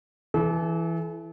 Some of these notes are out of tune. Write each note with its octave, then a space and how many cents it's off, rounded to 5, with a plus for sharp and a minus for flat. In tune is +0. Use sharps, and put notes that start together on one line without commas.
E3 +10 A4 -40